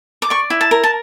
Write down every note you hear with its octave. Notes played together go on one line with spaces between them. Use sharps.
D6
D5 C#6
E4
A5
A#4
A5